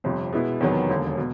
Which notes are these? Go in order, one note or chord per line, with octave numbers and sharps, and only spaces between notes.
G1 F2 C3
B2 G#3 B3 E4
E2 C3 D#3 F#3 B3
E1 D#2 D3
B2